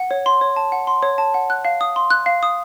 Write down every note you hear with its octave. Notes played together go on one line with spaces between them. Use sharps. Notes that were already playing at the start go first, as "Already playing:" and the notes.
Already playing: F#5
C#5
C6
C#5
A5
F#5
C6
C#5
A5
F#5
F#6
F5
D#6
C6
F#6
F5
D#6